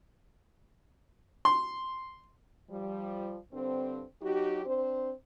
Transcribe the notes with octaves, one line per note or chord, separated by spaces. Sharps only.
C6
F3 G3
G2 D3 C4
F#3 D#4 F#4 G4
C4 D4 C5